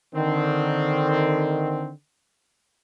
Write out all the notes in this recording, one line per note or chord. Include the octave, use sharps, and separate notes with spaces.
D3 D#3 C4